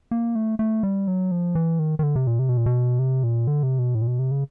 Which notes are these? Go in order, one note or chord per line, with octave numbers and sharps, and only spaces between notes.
A#3
A3
A3
G3
F#3
F3
E3
D#3
D#3
D3
C3
A#2
C3
B2
A#2
B2
C3
A#2
D3
C3
B2
A2
A#2
B2
C3
C#3